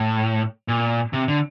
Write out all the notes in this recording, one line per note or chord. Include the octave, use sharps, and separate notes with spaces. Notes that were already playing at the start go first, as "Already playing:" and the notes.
Already playing: A2
A#2
C3
D3